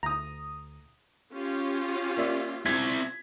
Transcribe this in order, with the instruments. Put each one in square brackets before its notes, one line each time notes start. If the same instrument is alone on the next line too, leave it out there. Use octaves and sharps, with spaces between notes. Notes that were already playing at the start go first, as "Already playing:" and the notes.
[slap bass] D2 [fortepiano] A#5 D#6
[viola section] C#4 F4 G4
[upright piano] A#3 D5 E5
[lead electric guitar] C4 E4 [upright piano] G#6 B6